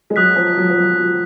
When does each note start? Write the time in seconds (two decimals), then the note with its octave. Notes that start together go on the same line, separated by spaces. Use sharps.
0.10 G#3
0.16 F#3 D#6 F#6 B6
0.36 F3
0.57 F#3
0.70 F3
0.77 F#3
0.98 F#3